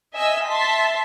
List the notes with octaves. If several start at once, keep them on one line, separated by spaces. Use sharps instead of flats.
D#5 E5 G#5 E6
E5 A5 C6 B6